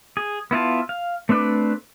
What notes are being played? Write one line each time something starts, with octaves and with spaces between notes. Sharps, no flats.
G#4
B3 E4 F4 A5
F5
A3 C4 D4 B4 D5